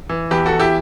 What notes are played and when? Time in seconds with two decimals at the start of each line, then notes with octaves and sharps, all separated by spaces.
0.09 E3
0.31 E2 G4 B4
0.46 F#4 A4
0.52 E2
0.60 E4 G4